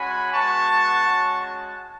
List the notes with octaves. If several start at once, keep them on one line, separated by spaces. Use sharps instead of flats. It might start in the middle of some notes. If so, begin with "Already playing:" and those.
Already playing: G#3 C#4 F#4 G#5 B5
G#3 B3 F#4 A5 C#6
G#3 C#4 F#4
A5 C#6